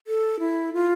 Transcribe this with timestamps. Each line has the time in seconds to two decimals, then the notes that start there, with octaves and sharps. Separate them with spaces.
0.07 A4
0.39 E4
0.74 F4